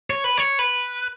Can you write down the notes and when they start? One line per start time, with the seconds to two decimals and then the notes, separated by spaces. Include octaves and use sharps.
0.10 C#5
0.24 B4
0.38 C#5
0.59 B4